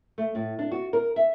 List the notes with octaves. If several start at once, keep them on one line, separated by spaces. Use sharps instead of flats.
A3
A2
D4
F#4
A#4
E5